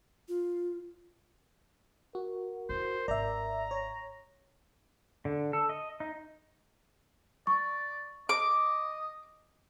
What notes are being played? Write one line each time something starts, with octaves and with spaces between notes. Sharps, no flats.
F4
F#4 A#4
E4 C5
G#1 D5 E5 A#5
C#5
D3
A4
D#5
D#4
D5 C#6
D#5 D6